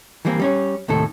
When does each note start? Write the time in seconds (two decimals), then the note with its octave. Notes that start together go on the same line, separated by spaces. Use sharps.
0.25 E3 F3 G3 A#3 C4
0.40 G3 C#4 C#5
0.88 D#2 A2 C3 D#3 A4